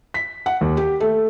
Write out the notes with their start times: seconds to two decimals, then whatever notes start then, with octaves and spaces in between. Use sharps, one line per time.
0.14 B6
0.46 F#5
0.61 D#2
0.77 G4
1.00 A3